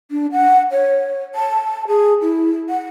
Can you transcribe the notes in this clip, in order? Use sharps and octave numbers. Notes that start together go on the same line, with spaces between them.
D4
F#5
C#5
A5
G#4
E4
F#5